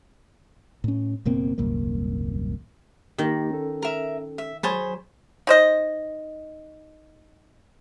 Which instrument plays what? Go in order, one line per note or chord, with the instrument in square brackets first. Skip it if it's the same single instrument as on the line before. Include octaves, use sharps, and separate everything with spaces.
[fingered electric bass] A2 C#4
F#1 B2 A#3 C4
D#1 C2 F#2 A#3
[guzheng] D#3 [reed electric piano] A#3 D#4 G4
[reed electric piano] C#4 A4
[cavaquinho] A#4 E5
E5
[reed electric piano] F#3 [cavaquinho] G#4 C5 B5 [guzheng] C#5 A5
[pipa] D#4 C5 D#5